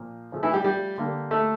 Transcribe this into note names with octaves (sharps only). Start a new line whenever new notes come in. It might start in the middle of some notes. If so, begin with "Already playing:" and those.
Already playing: A#2 F3 A#3
C#3 F3 A3
E3 E4
G3 G4
G3 G4
D3 G3 A#3
A3 A4